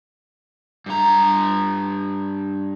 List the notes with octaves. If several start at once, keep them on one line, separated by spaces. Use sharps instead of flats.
G2 A#5